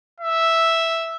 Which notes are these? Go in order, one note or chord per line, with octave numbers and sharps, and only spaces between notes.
E5